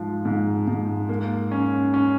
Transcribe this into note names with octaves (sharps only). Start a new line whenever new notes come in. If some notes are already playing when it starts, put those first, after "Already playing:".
Already playing: G#2 F3
G#2
G#2
A#3
C#4
C#4